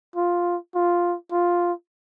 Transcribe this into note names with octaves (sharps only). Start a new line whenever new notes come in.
F4
F4
F4